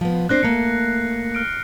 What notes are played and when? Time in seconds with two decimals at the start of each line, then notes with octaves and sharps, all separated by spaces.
0.01 F3 B3
0.29 C4 D4 C5 F#6 A#6 C7
0.43 A3 A#3 C#7
1.35 F6 D7